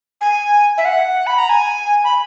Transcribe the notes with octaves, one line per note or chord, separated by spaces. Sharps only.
G#5
E5
F#5
B5
A#5
G#5
B5